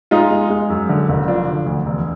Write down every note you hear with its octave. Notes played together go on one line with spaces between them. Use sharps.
G#3 D#4 F4
G#3
G#3
F#2
D3
F#1
F3 D4
D3
D2
E1